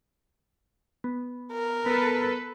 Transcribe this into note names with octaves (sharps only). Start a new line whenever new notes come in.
B3
A#4
B3 A4 B4